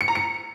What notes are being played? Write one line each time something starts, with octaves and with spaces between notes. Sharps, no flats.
C#7
A#5
C#7